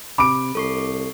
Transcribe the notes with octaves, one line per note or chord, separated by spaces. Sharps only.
C3 B5 D6 D7
C2 A4 C#6 C7